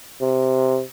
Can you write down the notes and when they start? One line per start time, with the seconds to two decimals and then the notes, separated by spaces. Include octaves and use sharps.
0.21 C3